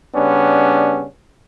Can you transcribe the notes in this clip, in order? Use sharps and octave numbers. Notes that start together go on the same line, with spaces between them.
C#3 G3 B3 C#4 D4